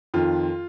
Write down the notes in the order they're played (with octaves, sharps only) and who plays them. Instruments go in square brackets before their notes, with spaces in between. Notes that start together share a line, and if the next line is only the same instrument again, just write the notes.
[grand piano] F2 D#3 F4